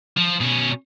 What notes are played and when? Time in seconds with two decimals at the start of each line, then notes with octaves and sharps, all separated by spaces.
0.17 F3
0.41 B2 C#4